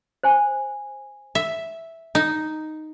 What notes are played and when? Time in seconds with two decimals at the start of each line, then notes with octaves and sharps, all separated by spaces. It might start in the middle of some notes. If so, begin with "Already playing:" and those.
0.23 C5 G#5
1.35 E5
2.15 D#4